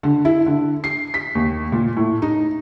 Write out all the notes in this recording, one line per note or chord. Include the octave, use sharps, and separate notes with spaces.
D3
E4
D3
C7
B6
D#2
A#2
A2
D#4